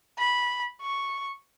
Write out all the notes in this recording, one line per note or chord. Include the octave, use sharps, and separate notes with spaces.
B5
C#6